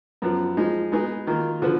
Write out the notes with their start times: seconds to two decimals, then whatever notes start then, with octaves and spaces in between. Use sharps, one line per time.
0.22 F#2 F3 B3
0.57 F3 G#3 D#4
0.92 G#3 B3 D#4 G#4
1.27 D#3 A#3 F4
1.62 D3 F3 B3